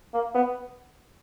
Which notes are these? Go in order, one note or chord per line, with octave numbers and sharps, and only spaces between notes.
A#3
B3